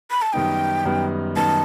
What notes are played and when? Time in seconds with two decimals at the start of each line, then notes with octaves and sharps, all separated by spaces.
0.11 B5
0.22 A5
0.33 F#2 D#3 G3 B3 D#4 G5
0.85 F#2 D#3 G3 B3 D#4
1.36 F#2 D#3 G3 B3 D#4 A5